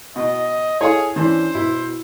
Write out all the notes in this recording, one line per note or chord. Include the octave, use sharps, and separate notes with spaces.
B2 D#5
E4 G#4 A4 C#5 F5
E3 C#4 D4 C5
B2 E4